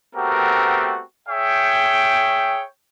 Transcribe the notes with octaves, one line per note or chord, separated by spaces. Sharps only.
A3 B3 C4 F#4 G4 A#4
G#4 C#5 E5 G5